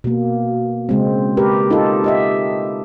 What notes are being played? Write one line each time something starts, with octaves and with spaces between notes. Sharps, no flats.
B2 A#3
C#3 G#3 C4
G4 A#4 B4
D#4 F4 G4 A4
G4 D#5 E5